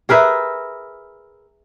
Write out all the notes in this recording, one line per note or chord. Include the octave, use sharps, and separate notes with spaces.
G#4 A#4 B4 E5